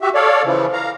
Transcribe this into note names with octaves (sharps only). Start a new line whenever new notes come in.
F#4 G4 E5
A4 C#5 D5 F5
C#3 E3 F3
F5 A#5